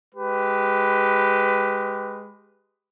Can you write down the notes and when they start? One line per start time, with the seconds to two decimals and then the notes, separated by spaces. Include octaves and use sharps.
0.15 G#3 G4 B4